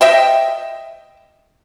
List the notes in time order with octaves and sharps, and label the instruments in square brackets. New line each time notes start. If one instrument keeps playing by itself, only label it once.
[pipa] D#5 E5 G5